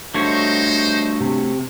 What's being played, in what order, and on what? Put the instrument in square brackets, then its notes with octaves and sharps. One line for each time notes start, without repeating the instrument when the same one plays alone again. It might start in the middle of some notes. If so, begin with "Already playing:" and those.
[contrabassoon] G2 [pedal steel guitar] A3 F#4 C#5 [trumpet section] D#4 C5
[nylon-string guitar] C3